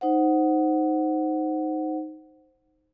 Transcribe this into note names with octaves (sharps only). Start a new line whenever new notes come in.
D#4 C5 F#5